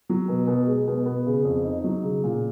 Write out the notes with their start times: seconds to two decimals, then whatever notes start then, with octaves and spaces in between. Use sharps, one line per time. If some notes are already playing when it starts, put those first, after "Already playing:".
0.09 F#3
0.28 B2
0.47 B2
0.67 G#3
0.87 B2
1.06 B3
1.26 C#3
1.45 F2
1.64 D#4
1.84 F#3
2.03 C#3
2.24 A#2